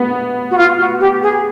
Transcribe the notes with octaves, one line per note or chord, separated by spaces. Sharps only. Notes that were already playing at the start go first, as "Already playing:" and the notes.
Already playing: B3
F#4
F4
F#4
G4
G#4